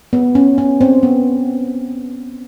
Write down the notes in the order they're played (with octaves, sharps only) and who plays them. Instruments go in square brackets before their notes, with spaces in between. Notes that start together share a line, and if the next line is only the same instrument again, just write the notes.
[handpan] B3
C#4
C#4
C4
B3